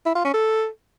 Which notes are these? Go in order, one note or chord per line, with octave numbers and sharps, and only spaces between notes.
E4
F4
C#4
A4